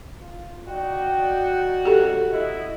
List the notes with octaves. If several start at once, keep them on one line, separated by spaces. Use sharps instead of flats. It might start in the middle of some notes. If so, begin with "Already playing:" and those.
F4
D#4 F#4 D5 G5
F2 G#2 C#3 G4 A4
E4 D#5